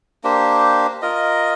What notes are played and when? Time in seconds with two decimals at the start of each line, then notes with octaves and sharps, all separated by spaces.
0.24 A#3 D4 G4 C5
1.02 F4 A#4 D#5